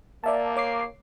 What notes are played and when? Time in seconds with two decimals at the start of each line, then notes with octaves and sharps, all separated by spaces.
0.24 A#3 D5 E5 A5
0.56 C#5 D6 C7